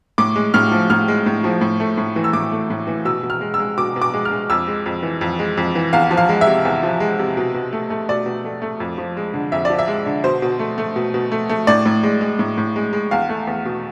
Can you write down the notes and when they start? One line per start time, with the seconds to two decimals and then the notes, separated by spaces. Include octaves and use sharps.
0.18 A2 D6
0.36 G#3
0.54 A2 F6
0.72 F3
0.90 A2 F6
1.08 G#3
1.26 A2
1.44 F3
1.61 A2
1.80 A3
1.98 A2
2.16 E3
2.24 E6
2.33 A2 D6
2.52 A3
2.70 A2
2.87 E3
3.05 B2 E6
3.23 B2
3.30 F6
3.41 G#3
3.54 E6
3.59 G#3
3.77 B2 D6
3.96 B2
4.02 D6
4.13 G#3
4.25 F6
4.31 G#3
4.50 F2 E6
4.67 G#3
4.86 F2
5.03 E3
5.21 F2
5.39 G#3
5.57 F2
5.75 E3
5.93 E2 F5
6.11 F3
6.17 F5
6.29 G#3
6.41 E5
6.47 C3
6.65 E2
6.83 F3
7.00 G#3
7.19 C3
7.37 B2
7.54 B2
7.73 A3
7.90 A3
8.09 B2 D5
8.26 B2
8.44 A3
8.62 A3
8.80 F2
8.98 F3
9.17 G#3
9.34 D3
9.52 F2 E5
9.65 D5
9.70 F3
9.79 E5
9.88 G#3
10.06 D3
10.24 B2 C5
10.42 B2
10.59 A3
10.78 A3
10.96 B2
11.14 B2
11.32 A3
11.49 A3
11.67 A2 D5
11.86 A2
12.03 G#3
12.21 G#3
12.39 A2
12.58 A2
12.76 G#3
12.93 G#3
13.11 E2 F5
13.29 A3
13.47 E2
13.65 B2